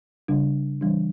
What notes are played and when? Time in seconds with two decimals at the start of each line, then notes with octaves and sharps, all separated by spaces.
0.28 C#3 G3 D4
0.81 E3 G3 D4